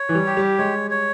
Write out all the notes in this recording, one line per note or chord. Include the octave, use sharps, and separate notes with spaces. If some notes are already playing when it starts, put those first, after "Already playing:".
Already playing: C#5
E3
G3
G4
G3
G#3 C#5
C#5